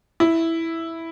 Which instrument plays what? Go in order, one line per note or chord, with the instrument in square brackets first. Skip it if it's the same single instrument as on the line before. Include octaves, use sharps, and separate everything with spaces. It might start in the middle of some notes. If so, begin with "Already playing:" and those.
[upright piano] E4